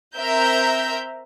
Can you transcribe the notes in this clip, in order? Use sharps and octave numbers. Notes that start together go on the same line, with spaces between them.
C4 A#4 E5 A#5 G6